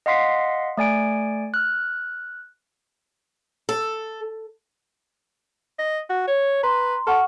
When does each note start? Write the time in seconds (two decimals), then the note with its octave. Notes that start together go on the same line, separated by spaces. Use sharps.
0.06 D#5 F5 F#5 C6 B6 C7
0.77 A3 D5 G#5 D7
1.54 F6 F#6
3.69 A4
5.79 D#5
6.10 F#4
6.28 C#5
6.63 B4 A#5 C6
7.07 A4 F#5 C#6 F6